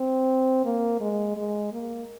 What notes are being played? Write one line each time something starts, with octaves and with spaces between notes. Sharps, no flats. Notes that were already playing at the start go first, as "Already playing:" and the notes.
Already playing: C4
A#3
G#3
G#3
A#3